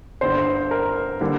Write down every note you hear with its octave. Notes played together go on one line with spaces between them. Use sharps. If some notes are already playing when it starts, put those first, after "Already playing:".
G1 G2 D3 C5
A#4
D3 G3 A#3